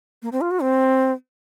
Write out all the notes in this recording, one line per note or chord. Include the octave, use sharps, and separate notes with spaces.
A#3
C4
F4
F#4
C4